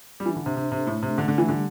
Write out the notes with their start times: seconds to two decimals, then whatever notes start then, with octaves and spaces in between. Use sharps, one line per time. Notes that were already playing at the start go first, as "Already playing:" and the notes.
0.20 G3
0.26 E3 D4
0.36 D3
0.41 D4
0.46 C3
0.57 C3 C5
0.71 C3 A4
0.87 A2 A3
1.02 C3 D4
1.17 D3 A3
1.28 D3
1.34 E3 G4
1.48 D3 G3